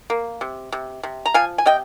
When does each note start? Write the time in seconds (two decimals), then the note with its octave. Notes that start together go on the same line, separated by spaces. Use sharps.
0.10 A#3
0.41 C3
0.72 C3
1.03 C3
1.26 A#5
1.34 F3 F5 G#5
1.58 G#5
1.66 C3 D#5 G5